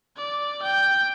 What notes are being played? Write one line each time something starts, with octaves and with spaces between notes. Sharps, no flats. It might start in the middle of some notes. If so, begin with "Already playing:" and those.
D5
G5